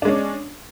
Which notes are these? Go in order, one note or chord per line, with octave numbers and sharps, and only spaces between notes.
G#3 C#4 D4